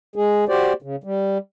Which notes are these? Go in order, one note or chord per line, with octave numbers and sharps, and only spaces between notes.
G#3 G#4
F#4 G4 C5 D5
C#3
G3